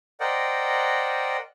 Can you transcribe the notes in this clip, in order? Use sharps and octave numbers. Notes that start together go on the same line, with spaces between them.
A#4 C5 D5 D#5 F#5 G5